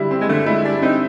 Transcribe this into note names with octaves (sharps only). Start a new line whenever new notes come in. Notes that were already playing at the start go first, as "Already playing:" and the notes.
Already playing: D3 G3 E4
C4
G#3
D3 A3
G#3 E4
G3 D4
C4 D#4